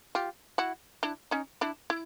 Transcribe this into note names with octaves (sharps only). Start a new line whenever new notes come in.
F4 G4
E4 F#4
D4 E4
C#4 D#4
D4 E4
E4